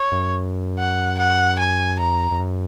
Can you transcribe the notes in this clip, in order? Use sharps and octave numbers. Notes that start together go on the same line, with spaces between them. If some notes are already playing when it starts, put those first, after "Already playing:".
Already playing: C#5
F#2
F#5
F#5
G#5
F2 A#5
F2
F#2